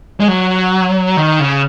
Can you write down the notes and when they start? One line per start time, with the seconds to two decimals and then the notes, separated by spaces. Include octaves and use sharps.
0.20 G#3
0.28 F#3
1.17 D#3
1.40 C#3